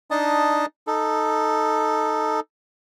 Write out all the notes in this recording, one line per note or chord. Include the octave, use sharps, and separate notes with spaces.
D4 D#4 D#5 A5
D#4 A4